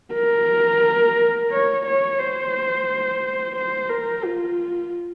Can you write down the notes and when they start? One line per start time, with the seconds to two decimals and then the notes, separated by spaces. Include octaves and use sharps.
0.14 A#4
1.51 C#5
1.86 C#5
2.19 C5
3.55 C5
3.89 A#4
4.24 F4